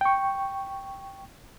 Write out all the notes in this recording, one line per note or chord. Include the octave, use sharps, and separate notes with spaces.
G5 C#6